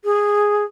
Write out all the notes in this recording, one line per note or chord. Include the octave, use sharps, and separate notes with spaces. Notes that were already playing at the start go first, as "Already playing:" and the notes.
G#4